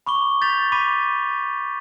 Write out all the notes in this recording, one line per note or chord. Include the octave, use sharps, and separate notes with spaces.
B5 C#6 D6 G7
G6 A6 B6 F7 G7
B5 D6 A6 B6 D#7